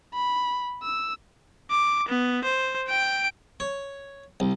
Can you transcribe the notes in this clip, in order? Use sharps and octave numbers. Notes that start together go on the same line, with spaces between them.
B5
E6
D6
B3
C5
G5 D7
C#5
C2